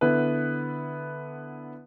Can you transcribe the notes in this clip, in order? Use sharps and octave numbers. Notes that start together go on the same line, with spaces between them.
D3 B3 E4 B4